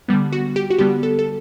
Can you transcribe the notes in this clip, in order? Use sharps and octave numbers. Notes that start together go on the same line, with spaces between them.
D3 G3 B3
F#4
G4
F#4
D3 G3 B3 G4
A4
A4